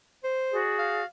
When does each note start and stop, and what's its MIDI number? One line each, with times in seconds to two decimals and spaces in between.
0.24 0.58 72
0.52 1.03 66
0.52 1.03 68
0.52 1.03 74
0.79 1.05 77